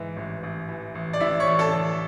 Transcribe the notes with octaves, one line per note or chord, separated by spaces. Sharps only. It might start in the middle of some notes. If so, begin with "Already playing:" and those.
Already playing: G#2 E3
A1
A1
E3
A1
D5
A1 E4 E5
C#5 C#6
A1
A4 A5
A1